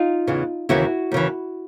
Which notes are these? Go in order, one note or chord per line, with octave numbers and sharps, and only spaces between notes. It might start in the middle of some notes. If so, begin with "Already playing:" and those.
Already playing: D#4 F4
E2 C#3 E3
D#2 C#3 E3 E4 F#4
D#2 C#3 E3